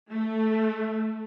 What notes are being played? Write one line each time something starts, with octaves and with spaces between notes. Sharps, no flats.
A3